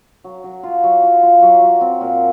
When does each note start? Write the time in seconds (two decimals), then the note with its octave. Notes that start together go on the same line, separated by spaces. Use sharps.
0.24 F#3
0.44 F#3
0.63 F4
0.84 F#3
1.03 F4
1.23 F4
1.42 F#3
1.62 F#3
1.81 C4
2.01 A#2